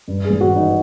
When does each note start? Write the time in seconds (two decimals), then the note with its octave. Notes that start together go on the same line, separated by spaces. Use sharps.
0.08 G2
0.25 G#4
0.30 G#1
0.41 F#4
0.51 E3 D#4